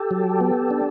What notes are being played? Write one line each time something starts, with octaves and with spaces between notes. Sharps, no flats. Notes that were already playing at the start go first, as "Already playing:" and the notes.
Already playing: G4 A4
F#3
B3
D4